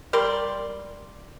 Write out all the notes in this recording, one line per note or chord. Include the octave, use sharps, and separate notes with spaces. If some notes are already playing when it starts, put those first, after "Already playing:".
G3 A#4 D5 C6